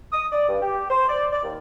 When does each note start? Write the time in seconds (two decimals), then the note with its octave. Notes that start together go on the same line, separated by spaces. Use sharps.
0.12 D#6
0.32 D5
0.48 G2
0.61 G4
0.90 C5
1.08 D5
1.32 D5
1.44 D#2